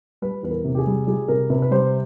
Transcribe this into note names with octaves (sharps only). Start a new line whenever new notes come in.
G3 B4
E2 B4
A#4
C3
G4
G#4
G3
G3 G#4
C3 A#4
C3 B4
B4
G3 C5